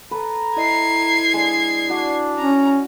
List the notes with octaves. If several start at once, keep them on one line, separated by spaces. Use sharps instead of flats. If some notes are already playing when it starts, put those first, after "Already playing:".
A4 B4 A#5
E4 C5 D#5 G#6 C7
G#3 D4 A5
D4 F#4
C#4 A#5